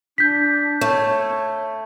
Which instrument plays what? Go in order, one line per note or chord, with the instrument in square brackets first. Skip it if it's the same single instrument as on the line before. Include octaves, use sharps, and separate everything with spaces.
[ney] D4 [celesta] G6 B6
[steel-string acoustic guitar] A3 [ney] C#5